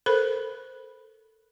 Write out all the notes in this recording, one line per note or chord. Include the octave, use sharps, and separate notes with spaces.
A4 A#4 C5 B5